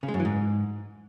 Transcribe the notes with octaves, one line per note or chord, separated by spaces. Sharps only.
C#3
G#3
F#2
E3
G#2